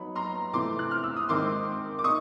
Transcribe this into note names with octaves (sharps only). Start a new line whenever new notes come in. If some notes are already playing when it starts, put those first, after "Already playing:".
Already playing: F#3 B3 D#4 B5
A#5 C6
C3 E3 A3 C6 D6
F#6
F6
E6
D#6
D#3 G#3 C4 D#4 C6 D6
D6
D#4 C#6 D#6